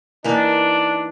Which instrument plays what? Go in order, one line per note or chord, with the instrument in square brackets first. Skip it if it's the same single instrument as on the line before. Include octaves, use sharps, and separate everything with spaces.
[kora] E3 A#3 D#4 [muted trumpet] D4